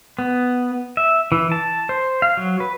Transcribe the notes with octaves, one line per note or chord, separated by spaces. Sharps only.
B3
E5
E3
A5
C5
F5
F#3
B4